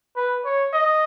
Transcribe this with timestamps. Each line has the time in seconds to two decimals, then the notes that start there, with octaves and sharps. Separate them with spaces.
0.16 B4
0.45 C#5
0.73 D#5